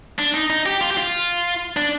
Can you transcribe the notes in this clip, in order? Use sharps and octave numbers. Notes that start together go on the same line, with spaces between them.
D4
D#4
D#4
G4
F4
G4
F4
D4